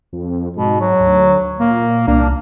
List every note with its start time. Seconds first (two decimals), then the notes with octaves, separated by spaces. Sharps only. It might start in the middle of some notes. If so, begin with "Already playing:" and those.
0.13 F2
0.57 G#2 B2
0.80 F#3
1.00 D2
1.59 A#2 A#3
2.07 C2 A#3 D4